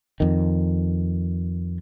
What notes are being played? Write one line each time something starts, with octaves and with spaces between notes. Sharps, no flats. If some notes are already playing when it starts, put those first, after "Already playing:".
F2 D#3